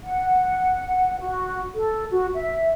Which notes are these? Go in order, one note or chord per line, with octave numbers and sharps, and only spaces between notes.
F#5
F#4
A4
F#4
E5